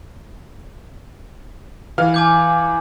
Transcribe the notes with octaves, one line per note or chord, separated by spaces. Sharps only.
E3 F5 F6
G#5 D6 G6